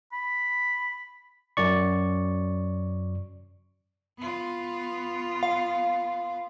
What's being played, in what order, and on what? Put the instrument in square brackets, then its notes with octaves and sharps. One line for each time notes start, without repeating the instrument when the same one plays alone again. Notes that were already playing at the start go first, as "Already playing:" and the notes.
[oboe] B5
[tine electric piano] F#2 C#4 D5 C#6
[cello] B3 F4
[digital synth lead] F5